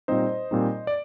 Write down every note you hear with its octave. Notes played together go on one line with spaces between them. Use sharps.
A#2 G3 C4 D#4 C5 D#5
A#2 G3 C4 D#4
D5